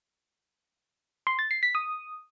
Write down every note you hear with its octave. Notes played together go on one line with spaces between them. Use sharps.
C6
A6
C7
B6
D#6